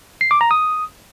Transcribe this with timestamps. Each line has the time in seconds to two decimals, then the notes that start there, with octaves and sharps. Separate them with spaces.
0.21 C7
0.31 D6
0.41 A#5
0.51 D#6